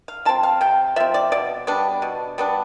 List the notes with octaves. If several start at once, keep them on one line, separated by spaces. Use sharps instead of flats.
F5
F3 C4 A5
F5
C3 G5
F3 C4 E5
D5
B2 D5
G3 B3 D4
B2
G3 B3 D4